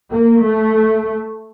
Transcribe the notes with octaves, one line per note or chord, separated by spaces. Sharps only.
A#3
A3